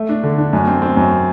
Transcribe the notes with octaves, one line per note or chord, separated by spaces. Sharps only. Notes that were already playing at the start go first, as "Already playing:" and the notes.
Already playing: A3
D4
D3
D4
F#2
C4
C4
F#2